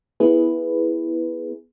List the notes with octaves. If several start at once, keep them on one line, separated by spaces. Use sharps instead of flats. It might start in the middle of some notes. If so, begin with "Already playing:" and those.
B3 E4 G#4 B4